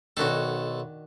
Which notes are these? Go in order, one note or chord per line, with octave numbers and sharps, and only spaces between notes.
B1 D#3 D4 F#4 A4